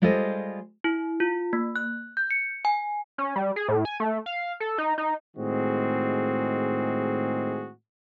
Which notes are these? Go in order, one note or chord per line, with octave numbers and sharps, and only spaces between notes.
G3 G#3 F4 A4 C5 D#5
E4
F4
A#3
F#6
G6
C#7
G#5
C#4
G3
G#4
A2
G#5
A3
F5
A4
D#4
D#4
A2 D#3 G#3 C4 F#4 G#4